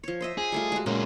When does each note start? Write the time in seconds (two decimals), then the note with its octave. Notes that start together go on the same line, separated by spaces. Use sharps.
0.04 F3 C#5
0.21 C5 D#5 E5
0.38 G#4
0.52 G3 A3 F4
0.72 G#3 F#4
0.86 A#2 G#3 A#3 C#4